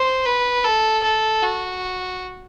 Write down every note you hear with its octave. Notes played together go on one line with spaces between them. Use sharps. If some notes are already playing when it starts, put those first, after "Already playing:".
Already playing: C5
B4
A4
A4
F#4